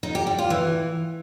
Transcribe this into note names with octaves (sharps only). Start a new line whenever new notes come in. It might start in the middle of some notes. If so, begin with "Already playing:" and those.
D#4
G4
G3
F4
E3